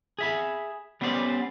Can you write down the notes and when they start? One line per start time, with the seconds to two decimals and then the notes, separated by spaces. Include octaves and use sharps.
0.19 G#4 E5 B5
1.01 G3 B3 C#4 C5 D5